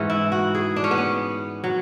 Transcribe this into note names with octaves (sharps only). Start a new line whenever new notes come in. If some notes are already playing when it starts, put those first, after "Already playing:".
Already playing: G#2 E3 C#4
E4
F#4
G#4
D4
C#4
B3
C#4
F#3